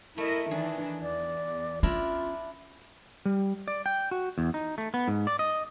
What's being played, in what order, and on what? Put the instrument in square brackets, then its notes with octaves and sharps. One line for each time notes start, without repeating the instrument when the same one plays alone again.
[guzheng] A3 [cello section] E4 A#4 D#5
[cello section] D#3 E3 D4 [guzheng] G#4
[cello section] E2 [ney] D5
[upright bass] C#4 [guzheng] D4 E4 A#4 [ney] F4
[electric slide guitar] G3
D5
G5
F#4
E2
D#4
A3
B3
G#2
D5
D#5